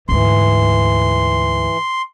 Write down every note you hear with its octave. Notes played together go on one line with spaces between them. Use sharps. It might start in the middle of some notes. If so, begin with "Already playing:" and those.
D2 G#2 E3 C6